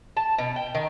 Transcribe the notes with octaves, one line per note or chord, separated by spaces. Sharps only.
A5
B2
G5
D#3